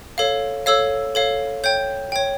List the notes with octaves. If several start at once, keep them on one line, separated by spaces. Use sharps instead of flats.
A4 C#5 F5
A4 C#5 F5 E6
A4 C#5 F5
C#5 G5 G6
C#5 G5